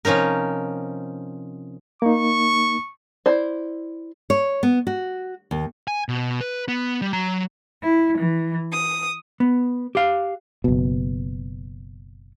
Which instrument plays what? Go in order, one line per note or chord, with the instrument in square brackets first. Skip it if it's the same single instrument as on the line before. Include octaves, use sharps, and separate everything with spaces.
[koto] C3 F3 C#4 D#4 A#4
[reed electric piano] A#3 D#4 [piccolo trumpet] C#6
[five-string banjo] E4 C5 D5
[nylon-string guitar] C#5
B3
F#4
D#2
[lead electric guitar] G#5
B2
B4
B3
G3
F#3 A#5
[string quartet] E4
E3
D#6
[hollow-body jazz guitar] B3
G4 F5
[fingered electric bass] F#1 B2